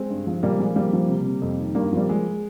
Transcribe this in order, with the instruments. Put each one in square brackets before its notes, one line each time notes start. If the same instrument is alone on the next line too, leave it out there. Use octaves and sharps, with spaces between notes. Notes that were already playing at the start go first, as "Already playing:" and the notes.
Already playing: [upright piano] G#3 C4
G2
F3
A#2 G3 A#3
F3 G#3
F3 G3 A#3
F3
C3
C3
F2
D#3
G2 G3 A#3
F3 G3 A#3
F3 G#3